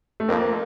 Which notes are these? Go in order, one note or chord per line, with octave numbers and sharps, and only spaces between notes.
A3
F2 A#3